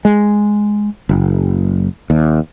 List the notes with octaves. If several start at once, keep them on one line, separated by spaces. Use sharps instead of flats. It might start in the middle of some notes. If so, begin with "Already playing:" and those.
G#3
F#1
D#2